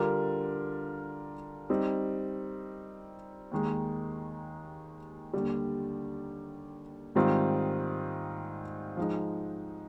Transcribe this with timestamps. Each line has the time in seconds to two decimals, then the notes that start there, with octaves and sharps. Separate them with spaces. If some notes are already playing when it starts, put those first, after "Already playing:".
Already playing: D3 G3 D4 F4 A#4
1.70 G3 C4 D#4
3.51 D#2 D#3 G#3
5.33 D#2 D3 G3
7.15 G#2 D#3 G3 C4 F4
8.97 F3 G#3 D#4